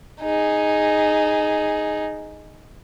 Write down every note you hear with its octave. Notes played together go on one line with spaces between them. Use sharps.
D#4 G#4